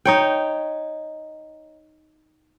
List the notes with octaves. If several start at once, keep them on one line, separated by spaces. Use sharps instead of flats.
D#4 C#5 G5